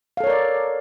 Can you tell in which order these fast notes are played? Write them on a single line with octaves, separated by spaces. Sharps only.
F5 A4 C#5 A#4 D5